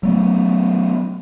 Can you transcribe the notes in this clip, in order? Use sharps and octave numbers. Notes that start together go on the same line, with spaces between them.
F#3 A3 B3